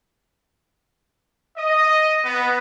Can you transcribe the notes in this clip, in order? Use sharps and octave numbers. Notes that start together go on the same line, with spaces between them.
D#5
B3